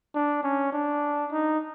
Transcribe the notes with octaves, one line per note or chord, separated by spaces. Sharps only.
D4
C#4
D4
D#4